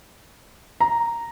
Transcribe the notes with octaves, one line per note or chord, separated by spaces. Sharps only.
A#5